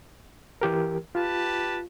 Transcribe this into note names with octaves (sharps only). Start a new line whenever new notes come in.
E3 G4 A#4
F4 G4 B4 A5